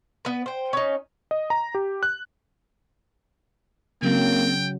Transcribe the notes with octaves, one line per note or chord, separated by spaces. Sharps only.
B3 B4
C5 G5
C#4 D#4
D#5
A#5
G4
F#6
C#3 F#3 A#3 C4 G5